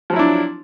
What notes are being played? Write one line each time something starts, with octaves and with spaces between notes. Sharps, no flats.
F3 F#3 D4 E4